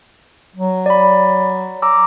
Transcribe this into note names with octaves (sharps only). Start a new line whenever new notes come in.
F#3
D5 B5
A#5 D6 E6